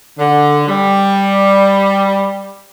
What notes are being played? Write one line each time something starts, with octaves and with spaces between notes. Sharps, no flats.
D3
G3